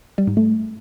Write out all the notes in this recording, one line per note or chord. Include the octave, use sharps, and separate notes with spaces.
G3
G#2
A3